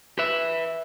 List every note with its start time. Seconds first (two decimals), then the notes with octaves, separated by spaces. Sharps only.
0.19 B4 E5